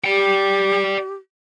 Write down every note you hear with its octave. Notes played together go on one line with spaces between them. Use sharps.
G4 D5 G5